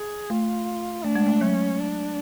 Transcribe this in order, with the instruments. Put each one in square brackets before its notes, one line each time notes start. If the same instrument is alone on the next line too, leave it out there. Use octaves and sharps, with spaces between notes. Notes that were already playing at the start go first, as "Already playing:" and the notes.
Already playing: [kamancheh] G#4
[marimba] A3 [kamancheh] F4
[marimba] A3 [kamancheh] D4
[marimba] G#3
A3
[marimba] F#3 [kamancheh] C#4
[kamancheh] D4